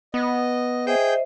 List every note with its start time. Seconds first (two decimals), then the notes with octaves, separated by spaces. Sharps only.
0.14 B3 D#5
0.87 G#4 C5 D#5 E5 G5 G6